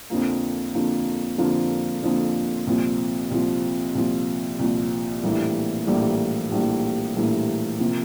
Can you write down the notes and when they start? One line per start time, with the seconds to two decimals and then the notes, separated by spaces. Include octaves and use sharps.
0.10 F2 D3 F3 A#3
0.74 F2 D3 F3 A#3
1.38 F2 D3 F3 A#3
2.03 F2 D3 F3 A#3
2.67 C2 A#2 F3
3.31 C2 A#2 F3
3.95 C2 A#2 F3
4.59 C2 A#2 F3
5.23 A#1 A2 E3 G3 A#3
5.87 A#1 A2 E3 G3 A#3
6.52 A#1 A2 E3 G3 A#3
7.16 A#1 A2 E3 G3 A#3
7.80 C3 F3 A#3